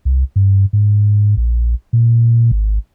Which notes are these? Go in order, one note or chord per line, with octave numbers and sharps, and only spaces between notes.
C2
G2
G#2
A#1
A#2
G#1